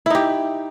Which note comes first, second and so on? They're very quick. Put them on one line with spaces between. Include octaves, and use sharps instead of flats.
E4 D#4 G4